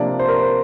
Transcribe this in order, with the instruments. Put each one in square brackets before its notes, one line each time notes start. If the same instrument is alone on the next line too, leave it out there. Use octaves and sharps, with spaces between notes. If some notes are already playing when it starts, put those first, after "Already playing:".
Already playing: [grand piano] C3 F3 A#3 D4 D5
C5
A#4
C5